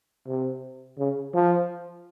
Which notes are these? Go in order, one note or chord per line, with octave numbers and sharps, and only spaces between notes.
C3
C#3
F3